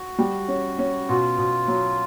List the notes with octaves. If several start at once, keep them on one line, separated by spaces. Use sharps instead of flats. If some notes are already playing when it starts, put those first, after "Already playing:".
Already playing: F#4
G3
C#4
C#4
B2 F4
B2
F#3